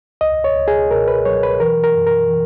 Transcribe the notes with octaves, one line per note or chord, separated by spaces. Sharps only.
C#2 D#5
C#5
C#2
G#4
B2 A#4
B4
F#3 C#5
B4
E3 A#4
A#4
F#2
A#4
E3